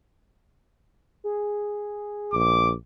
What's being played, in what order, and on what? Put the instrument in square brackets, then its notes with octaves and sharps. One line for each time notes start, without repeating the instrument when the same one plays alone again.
[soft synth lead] G#4
[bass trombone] A#1 [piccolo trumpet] D6